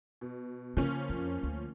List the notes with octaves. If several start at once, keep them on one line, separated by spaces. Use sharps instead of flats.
B2
C#3 F3 A#3 C#4
F2
D2